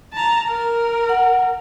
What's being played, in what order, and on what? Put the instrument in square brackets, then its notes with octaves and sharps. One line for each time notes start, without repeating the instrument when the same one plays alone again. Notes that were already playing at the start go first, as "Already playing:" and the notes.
[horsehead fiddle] A5 A#5
A#4
[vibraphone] F#5